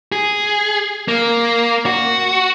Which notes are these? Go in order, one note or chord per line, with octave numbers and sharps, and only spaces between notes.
G#4
A#3
F#4